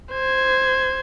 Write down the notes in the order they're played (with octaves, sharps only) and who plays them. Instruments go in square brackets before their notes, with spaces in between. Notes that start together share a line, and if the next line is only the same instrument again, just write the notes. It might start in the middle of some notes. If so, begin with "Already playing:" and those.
[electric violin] C5 G#6